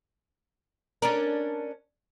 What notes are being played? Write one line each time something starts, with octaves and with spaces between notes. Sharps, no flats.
C#4 D4 A#4